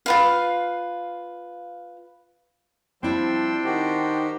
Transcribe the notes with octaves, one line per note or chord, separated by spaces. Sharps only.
F4 B4 F5
F3 G3 C4 D4 E4 G5 C6 E6
D#3 D#4 F#4 G4 C5